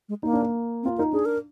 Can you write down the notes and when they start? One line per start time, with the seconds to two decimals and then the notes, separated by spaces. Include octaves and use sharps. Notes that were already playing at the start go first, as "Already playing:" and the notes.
0.09 G#3
0.23 A#3 D#4
0.33 D4
0.42 A#3
0.83 C4
0.86 F4
0.98 D#4 A#4
1.13 D4 G#4
1.25 A#4